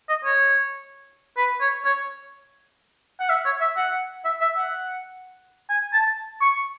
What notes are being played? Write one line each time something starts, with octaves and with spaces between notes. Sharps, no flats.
D#5
C#5
B4
C#5
C#5
F#5
E5
C#5
E5
F#5
E5
E5
F#5
G#5
A5
C#6